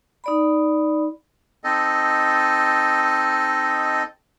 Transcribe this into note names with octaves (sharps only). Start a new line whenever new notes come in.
D#4 D5 B5
C4 D#4 A4 D#5